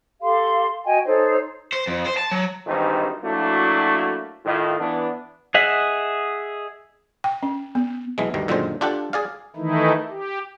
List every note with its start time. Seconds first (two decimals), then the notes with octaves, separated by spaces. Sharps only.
0.21 G4 A4 F5 C6
0.86 F#4 D#5 G5 G#5
1.05 D#4 A4 C5 C#5
1.72 C5
1.87 F2
2.06 C5
2.17 A5
2.31 F#3
2.66 G#1 G2 D#3 E3 D#4 C5
3.23 F#3 A3 A#3 D4 E4 F#4
4.45 A2 D#3 F4
4.78 E3 B3 D4
5.54 G#4 D#5 E5 F#5
7.24 G5
7.43 C#4
7.75 B3
8.18 B1 E3 G#3
8.34 D2 G2 D#3
8.48 F#2 A#2 D3 D#3 G#3 C5
8.81 D4 F4 G4 A4 F#5
9.13 G#4 D5 F5
9.56 D#3 E3 A3 D#4 E4
10.10 G4